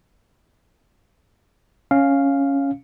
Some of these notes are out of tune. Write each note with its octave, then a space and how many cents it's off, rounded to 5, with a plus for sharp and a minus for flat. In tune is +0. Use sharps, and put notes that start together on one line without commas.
C#4 +0 F5 +0